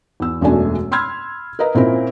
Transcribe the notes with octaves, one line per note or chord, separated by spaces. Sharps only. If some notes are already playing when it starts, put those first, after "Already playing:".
E2 E6
E1 F#2 B2 A3 D4 G#5
B5 C6 E6 F6 G#6
A#4 B4 D#5 A#5
A#2 C4 C#4 E4 A#4